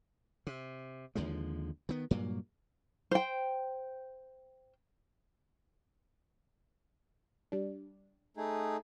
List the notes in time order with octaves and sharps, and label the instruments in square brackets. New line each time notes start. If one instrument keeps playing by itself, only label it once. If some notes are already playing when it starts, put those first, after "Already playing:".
[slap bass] C3
D#2 D3 F3 G#3
D#3 B3
G2 A#2 F#3 A#3
[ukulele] C5 G5
[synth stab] G3 D4
[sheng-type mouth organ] A3 D#4 G#4